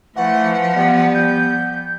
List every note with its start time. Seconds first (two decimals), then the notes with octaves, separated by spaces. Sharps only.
0.16 E3 F3 A3 F#5
0.75 G3 B3
1.14 G6